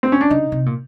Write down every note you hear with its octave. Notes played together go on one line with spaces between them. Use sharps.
C4
C#4
D4
C#3 D#4
C3
A#2